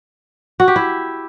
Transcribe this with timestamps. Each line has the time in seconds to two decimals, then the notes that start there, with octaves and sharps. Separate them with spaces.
0.60 F#4
0.68 G4
0.76 E4